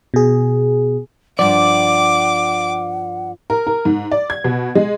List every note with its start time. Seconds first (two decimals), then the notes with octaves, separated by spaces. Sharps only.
0.14 B2 G#4
1.39 G2 F3 D5 F#5 D6
3.50 A#4
3.67 A#4
3.85 G#2
4.11 D5
4.30 G#6
4.44 B2
4.75 G#3